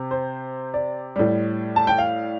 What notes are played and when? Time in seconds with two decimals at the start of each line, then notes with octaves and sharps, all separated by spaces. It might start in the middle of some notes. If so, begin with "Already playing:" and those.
Already playing: C3
0.11 C5
0.74 D5
1.16 A2 G3
1.76 A5
1.87 G5
1.98 F5